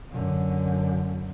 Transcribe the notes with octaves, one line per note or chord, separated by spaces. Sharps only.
F#2 D3